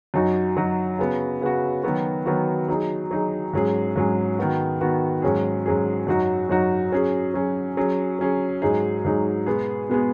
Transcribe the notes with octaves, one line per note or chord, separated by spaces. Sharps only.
F#2 F#3 D#4 F#4
F#2 F#3 D#4 F#4
C#3 B3 F#4
C#3 B3 F#4
D#3 F#3 B3 F#4
D#3 F#3 B3 F#4
F#3 D#4 G#4
F#3 D#4 G#4
G#2 F#3 C#4 G#4
G#2 F#3 C#4 G#4
D#3 B3 F#4
D#3 B3 F#4
G#2 F#3 C#4 G#4
G#2 F#3 C#4 G#4
F#2 F#3 D#4 F#4
F#2 F#3 D#4 F#4
F#3 C#4 G#4
F#3 C#4 G#4
F#3 C#4 G#4
F#3 C#4 G#4
G#2 F#3 D#4 G#4
G#2 F#3 D#4 G#4
B2 G#3 B3 G#4
B2 G#3 B3 G#4